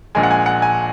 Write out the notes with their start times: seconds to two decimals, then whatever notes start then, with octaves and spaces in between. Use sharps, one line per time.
0.15 A#1 A#2 G#3 G#5
0.23 F#5
0.31 G#5
0.46 F#5
0.62 G#5